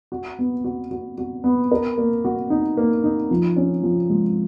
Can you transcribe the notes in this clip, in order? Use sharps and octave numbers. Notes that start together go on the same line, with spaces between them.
F#4
B3
F#4
F#4
F#4
B3
A#4
A#3
F#4
D#4
A#3
D#4
F3
C#4
F3
G#3